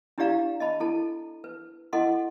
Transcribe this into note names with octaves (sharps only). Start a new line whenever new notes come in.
D4 E4 G4 D5 F5 A#5
D#5 A5 B5
E4 A4 A5
B4
E4 A4 D#5 F#5 C6